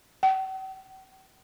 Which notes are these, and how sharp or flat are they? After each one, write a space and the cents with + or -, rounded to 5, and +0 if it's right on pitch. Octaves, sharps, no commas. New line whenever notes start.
G5 -45